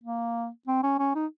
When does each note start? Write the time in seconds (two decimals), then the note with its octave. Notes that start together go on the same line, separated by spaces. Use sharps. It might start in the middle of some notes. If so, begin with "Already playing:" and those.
0.03 A#3
0.67 C4
0.83 C#4
0.99 C#4
1.15 D#4